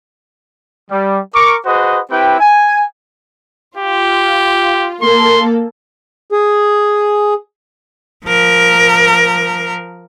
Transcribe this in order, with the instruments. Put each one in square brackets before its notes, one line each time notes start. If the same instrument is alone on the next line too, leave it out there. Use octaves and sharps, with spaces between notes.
[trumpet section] G3
A#4 C#6 D6
F#4 G#4 B4 C5 D#5 F#5
C4 E4 G4 B4 G5
G#5
[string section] F4 [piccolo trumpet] G4
[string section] A#3 A4 [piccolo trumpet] C6
[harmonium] G#4
[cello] F3 A#4